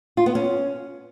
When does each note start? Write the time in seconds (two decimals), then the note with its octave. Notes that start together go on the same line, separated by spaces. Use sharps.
0.17 F4
0.26 B3
0.35 C#4